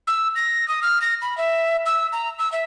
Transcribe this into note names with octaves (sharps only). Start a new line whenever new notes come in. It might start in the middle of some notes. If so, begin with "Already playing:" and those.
E6
A#6
D#6
F6
A#6
B5
E5
E6
A#5
E6
E5